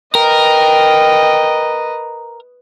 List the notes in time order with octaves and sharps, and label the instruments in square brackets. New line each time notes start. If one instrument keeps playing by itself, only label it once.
[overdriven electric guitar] A#4 [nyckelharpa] B4 D#5 [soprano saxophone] G5